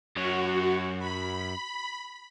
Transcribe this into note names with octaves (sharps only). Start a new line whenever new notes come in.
F#2 F#4 C#5
B5